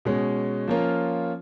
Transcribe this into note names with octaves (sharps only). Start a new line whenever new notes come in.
B2 G#3 C#4
F3 A#3 C#4 F4 A#4